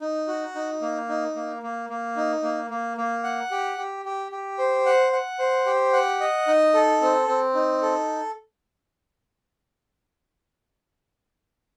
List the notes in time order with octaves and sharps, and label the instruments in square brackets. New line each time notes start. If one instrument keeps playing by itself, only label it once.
[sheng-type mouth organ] D#4
F#4
D#4
A#3
D#4
A#3
A#3
A#3
D#4
A#3
A#3
A#3
F#5
G4
G4
G4
G4
C5
F#5
F#5
C5
G4
F#5
D#5
D#4
A4
C4
C4
D#4
A4